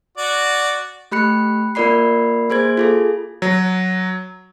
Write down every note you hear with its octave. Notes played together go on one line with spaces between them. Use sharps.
F#4 D5
A3 G4 B5 F#6 C#7
A#3 F4 A#4 D5 B5 C7
A#3 G#4 C5 G#6
F4 G#4 A4
F#3